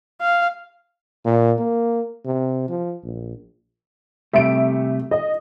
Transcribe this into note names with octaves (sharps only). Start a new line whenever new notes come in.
F5
A#2
A#3
C3
F3
A#1
C3 G3 A3 E5 D7
D#5